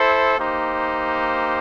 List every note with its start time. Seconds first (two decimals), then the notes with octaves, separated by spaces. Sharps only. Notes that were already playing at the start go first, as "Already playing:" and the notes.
Already playing: E4 A4 C5
0.38 A#3 D#4 G4 C5